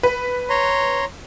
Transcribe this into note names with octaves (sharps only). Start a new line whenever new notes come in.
B4
C#5 A#5 C6